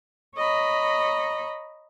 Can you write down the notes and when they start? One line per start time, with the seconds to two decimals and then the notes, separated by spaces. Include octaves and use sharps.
0.36 C#5 D#5 A#5 B5